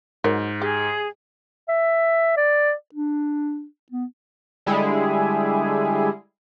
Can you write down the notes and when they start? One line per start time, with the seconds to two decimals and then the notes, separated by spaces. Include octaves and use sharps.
0.24 G#2 F#3 A#4 C#5
0.62 G4 G#4
1.69 E5
2.37 D5
2.94 D4
3.92 B3
4.66 D3 G3 G#3 E4 G#4